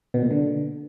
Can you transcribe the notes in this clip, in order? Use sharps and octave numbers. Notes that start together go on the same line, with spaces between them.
B2
A#2
D3